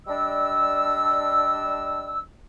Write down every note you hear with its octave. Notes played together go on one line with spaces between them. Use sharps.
G3 D4 D#5 E6